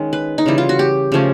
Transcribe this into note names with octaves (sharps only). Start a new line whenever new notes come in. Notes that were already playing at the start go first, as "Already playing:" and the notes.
Already playing: D#3 G#3 C#4
B4
D#4
C#3 E3 G3 E4
F4
F#4
G4
C#3 F3 A3 C#4